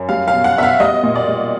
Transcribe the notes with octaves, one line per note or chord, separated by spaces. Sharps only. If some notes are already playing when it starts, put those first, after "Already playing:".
Already playing: F#2
G3 F5
F5
B2
F#5
B2 E5
F5
G3 D#5
A#2
D5
G3